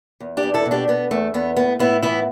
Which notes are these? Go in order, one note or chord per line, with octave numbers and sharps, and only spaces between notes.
E2
D4 G4
E2
E4 A4
B2
D4 G4
B2 B3
E2 A3
E2 B3
A2 B3
A2 B3 E4
E3 B3 E4